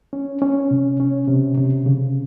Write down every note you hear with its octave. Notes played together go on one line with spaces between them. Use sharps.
C#4
C#4
C3
C#4
C3
C3
C#3